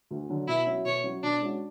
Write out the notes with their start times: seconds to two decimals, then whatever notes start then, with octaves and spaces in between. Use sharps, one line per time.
0.11 D2
0.30 D3 F#3
0.48 B2 E4
0.66 F#3 C#4 F#4
0.85 B2 C#5
1.04 F#3 C#4 F#4
1.23 B2 D4
1.41 G#3 C#4 F#4